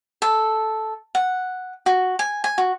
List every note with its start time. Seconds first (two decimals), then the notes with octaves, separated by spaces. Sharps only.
0.22 A4
1.15 F#5
1.86 F#4
2.19 G#5
2.44 G#5
2.58 F#4